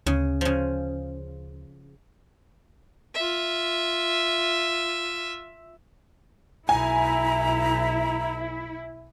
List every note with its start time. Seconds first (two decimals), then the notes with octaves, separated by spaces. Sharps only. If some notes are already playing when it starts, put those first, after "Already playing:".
0.06 D2 C#3
0.41 C#3 F3
3.14 F4 E5
6.69 B1 E4 G#5 A#5